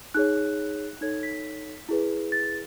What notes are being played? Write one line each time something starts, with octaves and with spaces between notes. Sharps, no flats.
D#4 G#4 C#5 F#6
D#4 A4 C#5 G#6
B6
E4 G#4 B4
A6